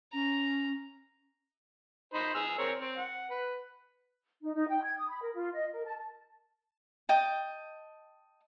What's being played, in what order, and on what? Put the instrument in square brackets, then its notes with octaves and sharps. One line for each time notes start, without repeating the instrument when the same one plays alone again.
[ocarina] C#4 [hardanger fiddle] A#5
[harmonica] D#4 C5 B5
G#4 E6 F6
C4 A#4 C#5
C4
F#5
B4
[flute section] D#4
D#4
G5
G#6
D#6
B5
A#4
F4
D#5
A#4
A5
[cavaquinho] D#5 G5 A5